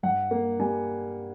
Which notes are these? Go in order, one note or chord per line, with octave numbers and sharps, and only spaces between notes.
G2 F#5
A#3
G3 G#5